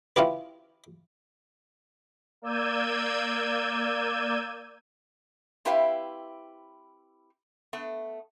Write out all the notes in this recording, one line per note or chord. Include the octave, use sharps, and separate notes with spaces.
C#4 E4 F4 G4 B4
A#3 D5 E6 G6 G#6 D#7
C4 E4 G4 B4 E5 F5
A3 B3